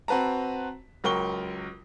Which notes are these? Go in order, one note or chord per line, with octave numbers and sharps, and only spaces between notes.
C4 F#4 B4 A5 A#5
C#2 F#3 A#4 G5 C#6 G7